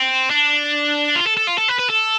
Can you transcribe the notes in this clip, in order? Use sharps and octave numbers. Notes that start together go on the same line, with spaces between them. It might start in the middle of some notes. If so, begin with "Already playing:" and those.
Already playing: C4
D4
F4
A4
A4
F4
A4
B4
B4
A4